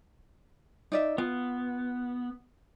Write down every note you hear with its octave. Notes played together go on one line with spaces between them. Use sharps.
D#4 D5 E5
B3 F4